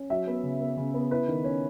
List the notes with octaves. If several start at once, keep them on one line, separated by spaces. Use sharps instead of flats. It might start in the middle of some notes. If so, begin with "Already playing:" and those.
Already playing: C#4
F#3 E5
B3
C#3
B3
C#3
B3
E4 B4
D#3
C#4